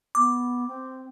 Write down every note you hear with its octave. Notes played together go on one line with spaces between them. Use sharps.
B3 D6
C4